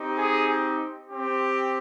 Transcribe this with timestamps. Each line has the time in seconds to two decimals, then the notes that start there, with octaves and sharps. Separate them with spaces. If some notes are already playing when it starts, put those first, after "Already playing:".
Already playing: C4 D#4 G4
0.17 G#4
1.06 C4 G4